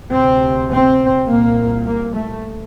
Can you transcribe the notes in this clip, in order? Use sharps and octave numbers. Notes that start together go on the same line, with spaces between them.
D2 C3 C4
C4
C2 A#2 A#3
A#3
A3